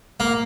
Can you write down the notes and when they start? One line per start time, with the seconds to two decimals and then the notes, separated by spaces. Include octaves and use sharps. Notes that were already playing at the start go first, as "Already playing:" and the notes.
0.20 A#3